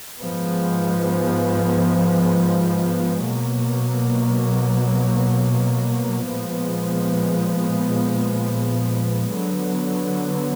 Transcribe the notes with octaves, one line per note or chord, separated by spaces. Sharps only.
G#2 F3 G#3 B3
B2 F#3 A#3
A#2 F3 G#3 B3
D3 F#3 B3